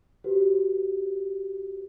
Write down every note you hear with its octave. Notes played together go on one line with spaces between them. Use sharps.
F#4 G4 B4 C5